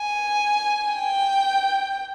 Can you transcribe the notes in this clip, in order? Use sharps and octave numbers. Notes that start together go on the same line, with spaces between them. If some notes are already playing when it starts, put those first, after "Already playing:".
Already playing: G#5
G5